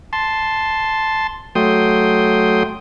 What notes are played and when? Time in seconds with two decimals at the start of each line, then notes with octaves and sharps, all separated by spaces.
0.13 A5 C6
1.55 F#3 A3 G5 C6 D#6